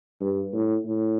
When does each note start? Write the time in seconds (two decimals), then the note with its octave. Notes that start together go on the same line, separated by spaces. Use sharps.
0.21 G2
0.53 A2
0.85 A2